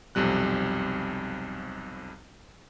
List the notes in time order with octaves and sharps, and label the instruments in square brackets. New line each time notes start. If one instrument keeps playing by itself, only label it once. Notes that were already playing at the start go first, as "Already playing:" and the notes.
[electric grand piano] B1 F2 C3 G3 F#6